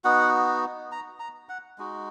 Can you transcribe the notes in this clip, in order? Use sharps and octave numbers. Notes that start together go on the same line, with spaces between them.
B3 D#4 F#4 F#5
A#5
A#5
F#5
G#3 D#4 F#4